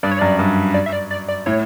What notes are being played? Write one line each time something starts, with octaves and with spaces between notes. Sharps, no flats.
G2 D5
C#5
F#2 D5
G2
D5
E5
D5
D5
D5
A2 C#5